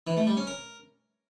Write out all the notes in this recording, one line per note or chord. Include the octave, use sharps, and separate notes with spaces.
E3
A3
G3
C#4
A#4